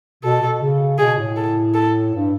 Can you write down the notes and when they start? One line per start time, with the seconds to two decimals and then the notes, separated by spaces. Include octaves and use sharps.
0.23 B2 A4
0.41 B2
0.62 C#3
0.98 B2 G#4
1.18 A2
1.36 A4
1.74 A4
2.13 G2